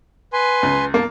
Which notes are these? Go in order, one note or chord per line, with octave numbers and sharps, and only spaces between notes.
B4 G#5 C6
C#2
A#3 A5